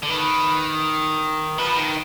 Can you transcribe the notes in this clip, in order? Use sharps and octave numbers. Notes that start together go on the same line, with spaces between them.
D3
D#3 B4
F3 B4
D#3